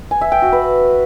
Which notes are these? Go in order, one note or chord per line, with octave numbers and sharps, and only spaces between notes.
G#5
E5
G5
F#4
B4